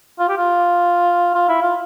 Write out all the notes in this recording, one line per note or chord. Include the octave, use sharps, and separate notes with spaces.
F4
G4
F4
F4
E4
F4